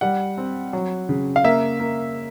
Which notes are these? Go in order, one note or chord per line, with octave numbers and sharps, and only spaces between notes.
G3 F#5
C4
F#3
C#3
F5
A#3 E5
A#3